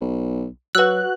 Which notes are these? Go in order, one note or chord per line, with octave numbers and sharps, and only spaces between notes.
B1
F#3 F#4 B4 E6 F#6